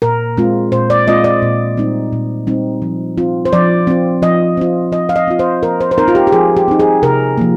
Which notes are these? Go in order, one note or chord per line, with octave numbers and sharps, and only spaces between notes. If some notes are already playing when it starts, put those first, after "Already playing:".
A#2 A#4
G#3 C4 F4
A#2 C5
D5
G#3 C4 F4 D#5
D5
A#2
G3 C4 D#4
A#2
G3 C4 D#4
F3
C4 F4
C5
F3 D5
C4 F4
F3 D#5
C4 F4
F3 D#5
F5
D#5
C4 F4
C5
F3 A#4
C5
C5
C4 D#4 A#4
F4
G4
G4
F3 G#4
G4
C4 D#4
G#4
C3 A#4
F3 A#3